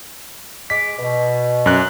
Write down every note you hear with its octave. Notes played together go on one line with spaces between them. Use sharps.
G#3 D6 B6
B2
F#2 F#6